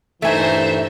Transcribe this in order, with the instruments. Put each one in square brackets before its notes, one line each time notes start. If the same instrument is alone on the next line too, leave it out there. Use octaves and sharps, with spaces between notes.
[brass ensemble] G2 A#2 E3 [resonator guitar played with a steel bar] A3 G#5 [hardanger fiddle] D#4 C5 [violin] E5